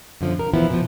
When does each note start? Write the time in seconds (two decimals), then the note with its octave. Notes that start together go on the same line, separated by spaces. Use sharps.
0.21 F#2 B2 D3 F3
0.39 A#4
0.54 E3 F3 B3 E4
0.70 B2 F3